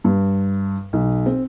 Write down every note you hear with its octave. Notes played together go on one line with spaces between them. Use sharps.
G2
B1
C4